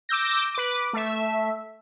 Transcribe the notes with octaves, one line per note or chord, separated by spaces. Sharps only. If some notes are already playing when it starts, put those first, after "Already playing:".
D6 E6 G6 A#6
B4 D6
A3 E5